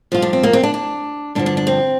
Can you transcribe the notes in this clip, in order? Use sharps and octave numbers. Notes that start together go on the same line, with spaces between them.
G2 F3 F4
D4
C4
A#3
C4
D4
D4
G2 D3 F3 D4
D4
D4
C4